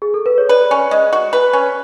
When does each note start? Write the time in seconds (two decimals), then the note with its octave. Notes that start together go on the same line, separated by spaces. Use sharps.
0.02 G#4
0.14 A4
0.26 B4
0.38 C#5
0.49 B4 D5
0.71 C#4
0.91 G#3
1.13 F#4
1.33 B4
1.53 C#4